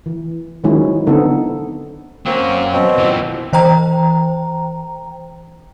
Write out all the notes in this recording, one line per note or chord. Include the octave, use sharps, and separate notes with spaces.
E3
D#3 F3 F#3 G#3 C#4 E4
D3 B3 C4 D#4 E4 A4
F#3 A#3 C4 C#4
B2 C4
A#2 E3
E3 C5 G5 A#5